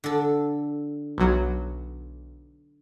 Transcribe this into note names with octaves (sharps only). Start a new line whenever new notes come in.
D3 A4
B1 F#3